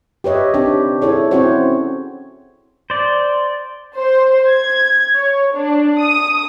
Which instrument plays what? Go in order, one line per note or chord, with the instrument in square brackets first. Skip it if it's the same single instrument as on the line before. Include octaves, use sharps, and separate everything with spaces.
[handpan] G4 B4 C#5 D#5 E5
C4 D4 D#4 G4 C#5
E4 G#4 A4 C#5 D5
C4 C#4 E4 F#4 C5 C#5
[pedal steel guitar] C5 D5
[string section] C5
G#6
C#5
D4
D#6